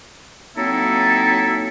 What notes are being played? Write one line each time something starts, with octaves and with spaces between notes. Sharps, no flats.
F#3 A#3 C4 D#4 E4 A4